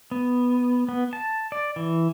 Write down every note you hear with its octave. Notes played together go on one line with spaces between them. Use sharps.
B3
B3
A5
D5
E3